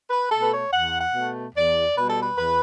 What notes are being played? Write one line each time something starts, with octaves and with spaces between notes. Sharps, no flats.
B4
B2 A3 A4
B4
C#5
E2 F#5
F#5
B2 A3
E2 D5
B2 G3 B4
A4
B4
E2 B4